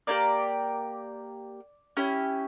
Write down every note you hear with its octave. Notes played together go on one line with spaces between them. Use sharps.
A#3 E4 G4 D5
C#4 E4 G4